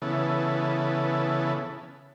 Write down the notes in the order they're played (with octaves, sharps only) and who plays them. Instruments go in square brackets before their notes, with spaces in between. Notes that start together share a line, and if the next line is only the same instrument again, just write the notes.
[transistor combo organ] C#3 E3 B3 A4